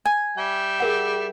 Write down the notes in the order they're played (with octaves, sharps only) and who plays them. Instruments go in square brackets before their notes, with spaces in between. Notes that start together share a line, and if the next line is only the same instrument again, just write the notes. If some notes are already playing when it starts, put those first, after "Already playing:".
[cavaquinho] G#5
[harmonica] G3 E5 G5
[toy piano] G#4 A#4 F#5